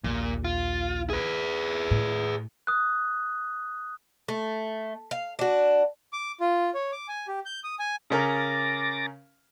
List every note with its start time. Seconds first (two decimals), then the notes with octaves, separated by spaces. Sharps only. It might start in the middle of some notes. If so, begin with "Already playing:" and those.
0.04 A#1 D#2 A#2
0.45 F4
1.10 G#4 B4
1.91 A2
2.67 D#6 F#6
4.28 A3
5.11 F5
5.39 D4 F#4
6.13 D6
6.40 F4
6.74 C#5
6.92 D6
7.08 G#5
7.28 G4
7.46 G6
7.64 D#6
7.79 G#5
8.10 C#3 C#4 A#4 D6 A6 A#6